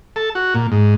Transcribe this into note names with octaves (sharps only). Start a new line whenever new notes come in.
A4
F#4
A#2
G#2